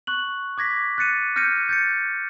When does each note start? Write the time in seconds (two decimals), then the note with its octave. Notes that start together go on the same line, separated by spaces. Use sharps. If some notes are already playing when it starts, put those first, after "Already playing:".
0.07 C#6 F#6 F#7
0.58 D6 G#6 A#6 B6
0.98 F#6 A6 C#7 D#7
1.36 F6 G6 A#6 C#7 D#7
1.69 G6 A6 C#7